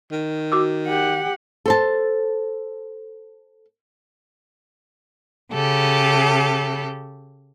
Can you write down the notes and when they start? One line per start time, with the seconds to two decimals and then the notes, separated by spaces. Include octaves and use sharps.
0.11 D#3
0.52 F#4 D6 E6
0.88 G4 F#5
1.66 A4 C5 A5
5.53 C#3 G4 A4